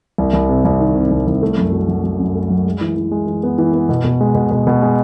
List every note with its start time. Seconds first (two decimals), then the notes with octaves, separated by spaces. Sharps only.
0.18 C2
0.33 C2
0.49 C3
0.65 C2
0.80 D#3
0.95 C3
1.11 C2
1.27 C2
1.42 A3
1.57 F#2
1.72 F#3
1.88 F#3
2.04 F#3
2.20 F#2
2.35 A3
2.50 F#3
2.65 G#3
2.81 E3
2.96 E3
3.11 G#3
3.27 E3
3.43 B3
3.58 E3
3.74 B3
3.89 B2
4.04 B2
4.21 G#3
4.35 B2
4.51 B2
4.67 B2
4.82 G#3